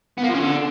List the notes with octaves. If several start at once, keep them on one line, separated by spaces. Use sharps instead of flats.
B3
A#3
F3
C#4
D3